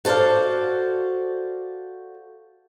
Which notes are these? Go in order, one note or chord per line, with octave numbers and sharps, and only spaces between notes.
F#4 A4 C5 D5 F5